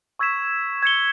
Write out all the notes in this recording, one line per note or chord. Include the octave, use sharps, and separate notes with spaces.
C#6 E6 G#6 B6 E7
G#6 C#7 G7